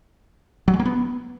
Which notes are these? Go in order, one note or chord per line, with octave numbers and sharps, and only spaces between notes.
F#3
G#3
A#3
B3